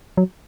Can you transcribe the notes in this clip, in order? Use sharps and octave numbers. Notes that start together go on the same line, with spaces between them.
F#3